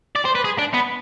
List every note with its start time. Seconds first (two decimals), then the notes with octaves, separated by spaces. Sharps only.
0.16 D5
0.25 C5
0.35 B4
0.45 G#4
0.59 D4
0.74 B3